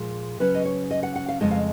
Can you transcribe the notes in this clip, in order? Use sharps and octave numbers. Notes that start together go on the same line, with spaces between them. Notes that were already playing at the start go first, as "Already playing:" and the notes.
Already playing: A#2 F3 G#3
C#3 F#3 C#4 B4
D#5
C#5
D#5
F#5
F#5
F5
F2 C#3 G#3 D#5
F5